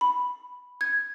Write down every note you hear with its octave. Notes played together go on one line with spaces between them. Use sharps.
B5
G#6